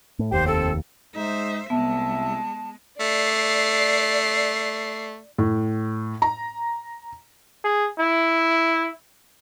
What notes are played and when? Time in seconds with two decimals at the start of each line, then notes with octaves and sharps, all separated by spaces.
0.19 A2
0.32 F1 D#2 G4 C5
0.47 C4 A4
1.15 G#3 D#4 C5 E5
1.70 C2 G#3 B3 E5 A5
3.00 A3 D5 C7
5.38 A2
6.22 A#5
7.65 G#4
8.00 E4